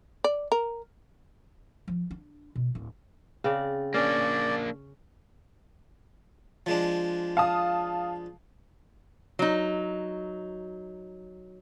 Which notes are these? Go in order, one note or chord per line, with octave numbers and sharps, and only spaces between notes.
D5
A#4
F3
D4
B2
D1
C#3 C4 D5
A#3 C#4 D4 D5
F3 G#3 D4
F5 A5 D#6
F#3 D#4